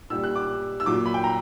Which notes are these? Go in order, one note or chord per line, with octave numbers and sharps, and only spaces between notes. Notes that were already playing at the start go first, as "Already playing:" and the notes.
A#2 G3 E6
F#6
D6
E6
A#2 F#3 D6
B5
G5
A#5